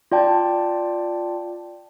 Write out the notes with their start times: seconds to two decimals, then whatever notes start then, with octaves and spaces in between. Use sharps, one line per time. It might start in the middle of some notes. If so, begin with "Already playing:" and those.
0.12 F4 D5 G5 A5